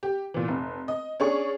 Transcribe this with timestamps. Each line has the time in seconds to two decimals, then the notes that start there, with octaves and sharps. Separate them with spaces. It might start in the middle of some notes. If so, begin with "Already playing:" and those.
0.03 G4
0.34 A#2 E3
0.48 F1
0.88 D#5
1.20 C#4 D4 G#4 C#6